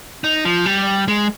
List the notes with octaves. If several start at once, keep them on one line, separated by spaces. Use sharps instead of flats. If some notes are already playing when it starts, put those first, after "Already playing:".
D#4
F3
G3
G#3